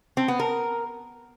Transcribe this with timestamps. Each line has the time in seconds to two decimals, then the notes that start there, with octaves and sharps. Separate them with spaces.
0.17 C4
0.28 B3
0.40 A#4